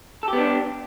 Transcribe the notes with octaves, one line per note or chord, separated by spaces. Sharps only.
B3 D4 G4 A4